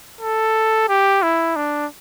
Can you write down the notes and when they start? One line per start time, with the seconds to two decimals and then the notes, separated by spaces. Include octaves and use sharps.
0.21 A4
0.89 G4
1.23 E4
1.56 D4